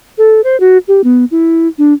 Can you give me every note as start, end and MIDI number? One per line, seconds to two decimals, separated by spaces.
0.18 0.41 69
0.44 0.59 72
0.60 0.78 66
0.88 1.01 67
1.04 1.25 59
1.31 1.68 64
1.78 1.93 62